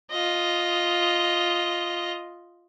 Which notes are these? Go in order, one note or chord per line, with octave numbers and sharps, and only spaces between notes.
F4 D#5